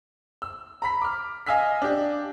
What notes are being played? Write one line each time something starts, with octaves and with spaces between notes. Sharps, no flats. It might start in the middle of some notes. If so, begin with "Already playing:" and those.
E6
A#5 B5 B6
D6 F6
D#5 F5 G#5 E6 F6 B6
D4 G4